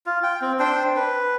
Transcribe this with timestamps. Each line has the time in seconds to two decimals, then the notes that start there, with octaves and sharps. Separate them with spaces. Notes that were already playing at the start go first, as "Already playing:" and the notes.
0.06 F4
0.23 G5
0.42 C4
0.59 D4 C5 G5
0.97 B4